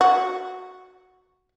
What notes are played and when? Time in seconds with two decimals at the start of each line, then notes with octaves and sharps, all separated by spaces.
0.01 F#4